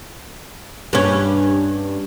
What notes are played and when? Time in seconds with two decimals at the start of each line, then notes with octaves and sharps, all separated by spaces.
0.93 G2 C#4